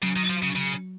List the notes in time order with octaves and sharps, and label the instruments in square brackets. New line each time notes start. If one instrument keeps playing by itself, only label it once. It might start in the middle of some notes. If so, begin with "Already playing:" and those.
[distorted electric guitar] C#3 [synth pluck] F#3
[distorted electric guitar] D#3
F3
C#3
C#3